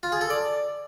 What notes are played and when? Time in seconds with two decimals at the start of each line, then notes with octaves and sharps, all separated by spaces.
0.03 F4
0.12 G#4
0.21 A4
0.30 D5